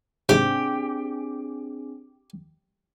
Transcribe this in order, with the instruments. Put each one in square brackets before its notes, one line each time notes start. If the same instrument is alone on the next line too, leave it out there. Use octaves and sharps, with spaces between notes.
[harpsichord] G#2 C3 [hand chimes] C4 D4 G#4 [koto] G4